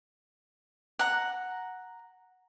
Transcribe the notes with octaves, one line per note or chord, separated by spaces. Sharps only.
F#5 A#5